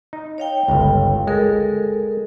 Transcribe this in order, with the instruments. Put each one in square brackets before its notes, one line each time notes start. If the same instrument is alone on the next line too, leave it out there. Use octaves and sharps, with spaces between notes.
[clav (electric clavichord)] D#4
[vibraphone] C#5 F5 G5
[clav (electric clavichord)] G1 C#2
[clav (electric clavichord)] G#3 [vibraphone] A4 A#4